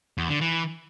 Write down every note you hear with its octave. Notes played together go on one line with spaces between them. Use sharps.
E2
D3
E3